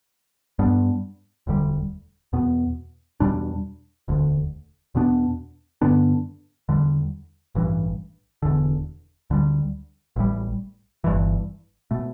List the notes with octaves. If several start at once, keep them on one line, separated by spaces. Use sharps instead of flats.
G2 G3 B3 D4
E1 D2 D3 G3
E2 B2 B3
E2 B2 G3 D4
E1 D2 D3
E2 B2 B3 D4
G2 D3 B3 D4
E2 D3 G3
A1 G2 E3
E1 E2 D3
D2 D3 G3
A1 A2 G3
G1 G2 E3
B2 A3